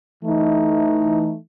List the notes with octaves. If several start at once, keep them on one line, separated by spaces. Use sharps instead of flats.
E3 A3 D#4